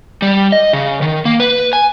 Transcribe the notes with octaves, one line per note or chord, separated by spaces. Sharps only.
G3
D#5
C#3
D#3
A#3
B4
G#5